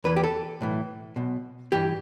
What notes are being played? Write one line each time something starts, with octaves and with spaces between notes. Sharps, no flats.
E2 E3 B4
G4
A4
B1 A2 E3
B1 B2
G2 E3 G4